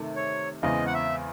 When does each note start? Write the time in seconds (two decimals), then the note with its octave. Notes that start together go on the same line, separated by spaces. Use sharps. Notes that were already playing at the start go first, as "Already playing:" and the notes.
Already playing: C3 D#3 A3
0.16 C#5
0.63 E2 C#3 E3 G#3 C4 D#5
0.87 F#5
0.94 E5